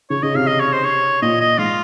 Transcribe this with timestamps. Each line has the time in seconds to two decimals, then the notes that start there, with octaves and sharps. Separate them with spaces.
0.10 C#3 C#5
0.23 C#3 D#5
0.35 C3 F5
0.47 D#5
0.60 C#5
0.72 C5
0.84 C#5
1.22 A#2 D#5
1.41 D#5
1.58 G#2 F4